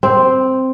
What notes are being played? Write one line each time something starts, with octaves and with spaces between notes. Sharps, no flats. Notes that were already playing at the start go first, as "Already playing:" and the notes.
C4